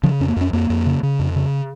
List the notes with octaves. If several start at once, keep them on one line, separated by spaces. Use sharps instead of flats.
C#3 F3
F2 C#4
A#3
F2 C#4
F2 A#3
F2
C#3
C#3
F2
C#3